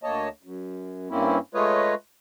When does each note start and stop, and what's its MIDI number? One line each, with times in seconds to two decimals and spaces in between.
0.03 0.29 38
0.03 0.29 58
0.03 0.29 73
0.03 0.29 75
0.03 0.29 81
0.43 1.09 42
1.10 1.39 43
1.10 1.39 58
1.10 1.39 60
1.10 1.39 61
1.10 1.39 64
1.54 1.94 56
1.54 1.94 57
1.54 1.94 65
1.54 1.94 71
1.54 1.94 73
1.54 1.94 75